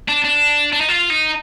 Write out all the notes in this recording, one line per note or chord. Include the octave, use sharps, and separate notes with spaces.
D4
D4
D4
D#4
F4
D#4